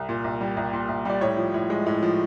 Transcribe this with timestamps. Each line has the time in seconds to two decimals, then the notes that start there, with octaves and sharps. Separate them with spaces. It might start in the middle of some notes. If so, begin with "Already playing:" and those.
Already playing: C2
0.09 A#2
0.24 C2
0.41 G3
0.57 C2
0.73 A#2
0.89 C2
1.05 G3 D5
1.21 A2 C#5
1.37 F3
1.54 A2
1.70 G#3
1.86 A2
2.03 F3